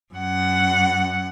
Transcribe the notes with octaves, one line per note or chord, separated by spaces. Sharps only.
F#2 F#5